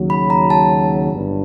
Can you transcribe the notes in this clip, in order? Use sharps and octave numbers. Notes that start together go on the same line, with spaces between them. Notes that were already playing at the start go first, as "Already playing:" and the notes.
Already playing: D#2 C#3 F#3
B5
A#5
A5
G1 G2